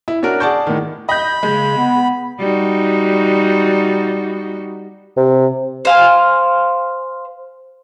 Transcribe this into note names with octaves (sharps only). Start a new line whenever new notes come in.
E4
C#4 D4 F#4 A#4
G#4 D5 F#5 A5 C#6 G6
A2 D#3
D#5 B5 G6
C#3 G#3
B3
G3 D#4 F#4
C3
C5 F5 G#5